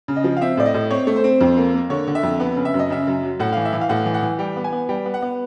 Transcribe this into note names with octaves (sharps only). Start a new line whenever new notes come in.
C#3
D#5
F3
F5
C4 E5
A2 D5
D#5
A2
C4 C#5
A3
C5
C4
F2
A#3
A#3
D3 C#5
D3
E5
F2
B3
C#3
E5
F#2
D#5
C#3 E5
F#2
F#3
A2 F#5
F5
E3
E5
E3
F5
A2 F#5
E3
F#5
E3
G3 G5
B3
G#5
B3
G3 G5
B3
F#5
B3